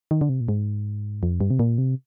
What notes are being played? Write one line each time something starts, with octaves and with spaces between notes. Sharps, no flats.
D#3
D3
C3
A#2
G#2
F2
G2
C3
A#2
C3